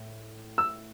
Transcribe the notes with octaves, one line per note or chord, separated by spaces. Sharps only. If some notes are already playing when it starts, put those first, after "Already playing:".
Already playing: A2
E6